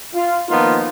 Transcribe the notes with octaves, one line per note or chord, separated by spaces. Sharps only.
F4
D#3 F3 A#3 B3 D#4 F4